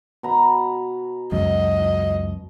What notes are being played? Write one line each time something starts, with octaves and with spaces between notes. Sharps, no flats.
B2 A#5 B5
C#2 F#2 D#5